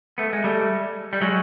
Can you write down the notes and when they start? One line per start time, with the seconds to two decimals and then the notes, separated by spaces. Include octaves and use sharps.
0.18 A3 B3
0.33 G#3
0.44 G3 A3
1.13 G3
1.21 F#3 G#3